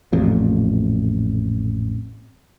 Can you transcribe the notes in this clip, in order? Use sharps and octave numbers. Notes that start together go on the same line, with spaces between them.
A1 F2 A#2